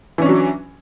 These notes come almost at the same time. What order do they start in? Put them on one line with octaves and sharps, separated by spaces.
E3 C#4 D4 F#3